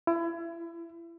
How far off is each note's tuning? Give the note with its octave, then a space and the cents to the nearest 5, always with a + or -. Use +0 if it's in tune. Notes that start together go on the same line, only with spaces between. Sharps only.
E4 +30